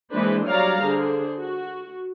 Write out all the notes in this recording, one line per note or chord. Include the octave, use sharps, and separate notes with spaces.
E3 G#3 A#3 D4 B4 C5
F#3 G3 C#5 D5 F5 A#5
D3 G#4 C5
F#4